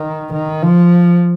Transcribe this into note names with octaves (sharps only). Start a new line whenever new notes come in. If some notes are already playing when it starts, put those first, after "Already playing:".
Already playing: D#3
D#3
F3